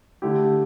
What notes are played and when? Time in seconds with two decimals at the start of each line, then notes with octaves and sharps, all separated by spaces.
0.22 D3 A3 E4 G4